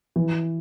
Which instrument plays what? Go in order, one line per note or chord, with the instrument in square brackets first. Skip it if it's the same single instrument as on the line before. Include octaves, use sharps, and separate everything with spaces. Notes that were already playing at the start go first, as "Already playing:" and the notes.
[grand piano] E3